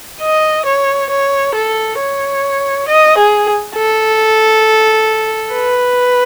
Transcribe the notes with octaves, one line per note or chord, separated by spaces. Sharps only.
D#5
C#5
C#5
A4
C#5
D#5
G#4
A4
B4